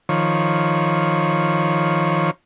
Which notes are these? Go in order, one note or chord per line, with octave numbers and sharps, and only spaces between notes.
D#3 F3 C#5